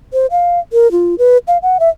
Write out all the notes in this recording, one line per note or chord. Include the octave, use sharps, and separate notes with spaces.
C5
F5
A#4
F4
B4
F5
F#5
E5